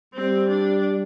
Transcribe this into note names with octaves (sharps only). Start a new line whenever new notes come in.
G3 C4
D4